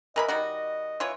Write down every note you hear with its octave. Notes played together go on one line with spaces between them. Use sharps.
E3 A#4 D#5 B5
D#3 G3 F#4
E3 F4 C#5